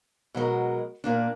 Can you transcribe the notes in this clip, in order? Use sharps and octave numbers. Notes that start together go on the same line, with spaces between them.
B2 F#3 G#3 A#4
A#2 A#3 D4